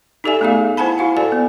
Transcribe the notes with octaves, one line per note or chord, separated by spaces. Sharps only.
D#4 G4 A4 D5 E5 G#5
A3 B3 D#4 G#4 F5
E4 C5 F#5 G#5 A5 B5
E4 F#4 F5 F#5
A4 C5 D5 G#5
B3